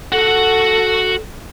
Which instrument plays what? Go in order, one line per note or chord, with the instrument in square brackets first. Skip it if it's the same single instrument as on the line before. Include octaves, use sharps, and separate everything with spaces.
[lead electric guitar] F#4 F#5 [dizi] A4